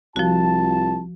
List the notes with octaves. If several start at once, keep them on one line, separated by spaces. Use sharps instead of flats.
C2 F3 F4 F#4 A5